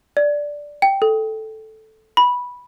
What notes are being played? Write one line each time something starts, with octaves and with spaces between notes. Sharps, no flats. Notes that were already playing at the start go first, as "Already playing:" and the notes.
D5
G5
A4
B5